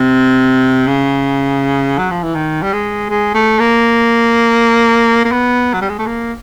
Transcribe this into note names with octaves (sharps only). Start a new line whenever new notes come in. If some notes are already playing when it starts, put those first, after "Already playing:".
Already playing: C3
C#3
F#3
F3
E3
D#3
G3
G#3
G#3
A3
A#3
A#3
B3
F#3
G3
G#3
A3
A#3